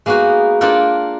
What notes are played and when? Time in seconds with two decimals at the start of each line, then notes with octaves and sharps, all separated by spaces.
0.06 G#3 A#3 B3 D#4 F#4
0.61 A#3 D4 F4 A4 A#4 G5